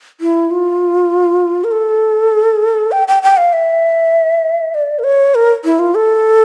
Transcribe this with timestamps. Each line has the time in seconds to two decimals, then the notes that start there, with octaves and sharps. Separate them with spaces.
0.21 E4
0.51 F4
1.64 A#4
1.71 A4
2.92 G5
3.08 G5
3.23 G5
3.37 F5
3.53 E5
4.74 D5
4.99 A#4
5.04 C#5
5.35 A#4
5.65 E4
5.79 F4
5.95 A4